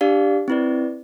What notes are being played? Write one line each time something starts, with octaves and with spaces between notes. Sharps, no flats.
D4 G4 D5 F5
C4 E4 B4 D5